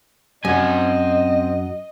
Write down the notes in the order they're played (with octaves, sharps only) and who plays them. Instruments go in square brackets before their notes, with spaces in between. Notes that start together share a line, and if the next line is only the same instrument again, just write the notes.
[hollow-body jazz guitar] F#2 [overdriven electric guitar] C4 G#5 [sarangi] D#5